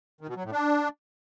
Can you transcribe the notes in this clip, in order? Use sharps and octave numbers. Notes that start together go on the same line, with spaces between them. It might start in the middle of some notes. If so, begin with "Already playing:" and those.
D#3
B2
F#3
A2
D4